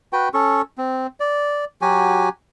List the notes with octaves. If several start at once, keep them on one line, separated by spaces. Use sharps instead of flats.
F#4 B4 G5
C#4 A4 C#6
C4
D5
F#3 F#4 G4 G#5